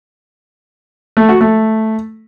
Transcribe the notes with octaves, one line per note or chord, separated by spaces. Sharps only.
A3
F#4
A3